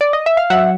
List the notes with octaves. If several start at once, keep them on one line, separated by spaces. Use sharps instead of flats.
D5
D#5
E5
F5
F#3 E5 F#5